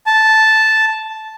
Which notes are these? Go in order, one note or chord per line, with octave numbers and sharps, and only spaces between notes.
A5